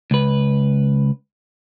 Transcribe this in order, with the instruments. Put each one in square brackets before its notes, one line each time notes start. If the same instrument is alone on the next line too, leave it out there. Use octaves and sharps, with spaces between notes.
[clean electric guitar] C#2 B4